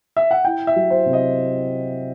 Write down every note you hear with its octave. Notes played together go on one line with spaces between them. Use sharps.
E5
F#5
E4 G5
E5
F#3
C5
C3
D#5